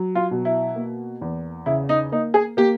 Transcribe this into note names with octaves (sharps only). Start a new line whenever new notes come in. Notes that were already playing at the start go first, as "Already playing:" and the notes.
Already playing: F#3
F4
B2
E4
A#3
E2
C#3 E4
D#4
A#3 D#4
G#4
A#3 G4